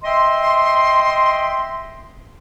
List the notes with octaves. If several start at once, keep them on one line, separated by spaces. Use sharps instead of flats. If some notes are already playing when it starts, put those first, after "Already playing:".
D#5 E5 G5 C6